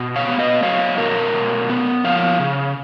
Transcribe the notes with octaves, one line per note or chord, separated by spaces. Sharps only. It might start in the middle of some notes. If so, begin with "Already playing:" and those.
Already playing: B2
C#5 F5
B3
B4 D#5
F#3 C#5 F5
B2 A#4 C#5
B2
B3
F3 C#5 F5
C#3